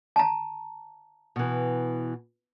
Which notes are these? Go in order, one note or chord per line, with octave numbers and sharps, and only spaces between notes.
A5 A#5
B2 E3